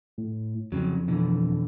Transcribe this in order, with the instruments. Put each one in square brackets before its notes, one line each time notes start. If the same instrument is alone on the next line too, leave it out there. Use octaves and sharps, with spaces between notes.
[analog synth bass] A2
[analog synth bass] F2 [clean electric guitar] C#3 F#3
[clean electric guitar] B2 D3 E3